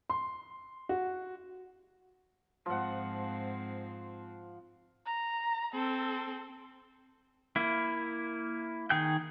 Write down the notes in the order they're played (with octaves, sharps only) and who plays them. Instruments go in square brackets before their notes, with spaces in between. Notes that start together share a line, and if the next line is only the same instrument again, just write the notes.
[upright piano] C6
F#4
[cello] G#2 C4 [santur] F3 F#5
[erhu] A#5
[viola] C4 [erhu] A4
[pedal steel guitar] A#3 E4
D#3 G#4 G5 G6